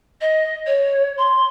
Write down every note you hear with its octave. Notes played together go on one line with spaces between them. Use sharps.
D#5
C#5
C6